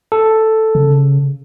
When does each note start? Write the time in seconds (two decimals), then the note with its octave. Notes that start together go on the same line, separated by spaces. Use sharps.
0.12 A4
0.75 C#3